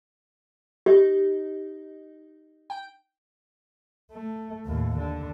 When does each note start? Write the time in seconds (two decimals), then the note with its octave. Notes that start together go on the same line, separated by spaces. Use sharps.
0.86 D#4 G4
2.70 G5
4.12 A3
4.66 D#2 A2
4.98 D3